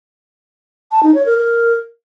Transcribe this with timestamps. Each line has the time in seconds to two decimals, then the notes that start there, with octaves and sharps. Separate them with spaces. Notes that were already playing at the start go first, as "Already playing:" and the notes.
0.92 A5
1.03 D#4
1.14 C#5
1.26 A#4
1.37 A#4